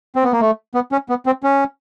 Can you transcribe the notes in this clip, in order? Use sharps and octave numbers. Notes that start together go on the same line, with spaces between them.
C4
B3
A#3
A3
B3
C#4
B3
C4
C#4